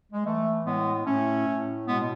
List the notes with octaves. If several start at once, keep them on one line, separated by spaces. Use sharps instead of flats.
G#3
E3 A3
A2 G#3 B3
A2 A3 C#4
A2
B2 G#3 B3